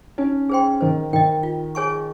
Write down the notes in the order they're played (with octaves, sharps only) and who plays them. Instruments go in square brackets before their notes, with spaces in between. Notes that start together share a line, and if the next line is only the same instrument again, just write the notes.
[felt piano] C#4 [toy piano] D#4
[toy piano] G#4 C5 G5 C6
[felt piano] D#3 [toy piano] C5
[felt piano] D#3 [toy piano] D#5 G5
[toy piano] F4
G#4 C#5 G#5 C#6